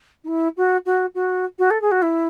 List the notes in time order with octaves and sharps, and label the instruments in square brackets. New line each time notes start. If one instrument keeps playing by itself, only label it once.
[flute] D#4
E4
F#4
F#4
F#4
F#4
A4
G#4
F#4
E4